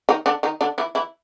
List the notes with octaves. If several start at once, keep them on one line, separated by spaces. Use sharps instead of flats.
D#3 D#4
D3 D4
D#3 D#4
D3 D4
E3 E4
E3 E4